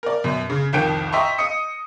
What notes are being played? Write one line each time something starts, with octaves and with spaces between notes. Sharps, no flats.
A#4 D5
F#2 B2
C#3
C2 F2 D#3 G5 G6 D7
D#5 E5 G5 A#5 C6 C#6
D#5 D#6 C#7